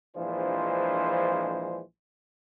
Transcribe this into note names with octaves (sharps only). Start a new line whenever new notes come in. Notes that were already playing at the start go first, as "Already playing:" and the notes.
A#1 E3 F3 G#3 D4 C5